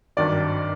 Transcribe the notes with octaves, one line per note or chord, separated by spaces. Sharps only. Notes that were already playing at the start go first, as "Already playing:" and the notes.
G#1 G2 D#3 F#3 D5